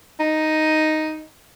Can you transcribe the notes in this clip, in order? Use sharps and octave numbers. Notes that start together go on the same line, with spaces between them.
D#4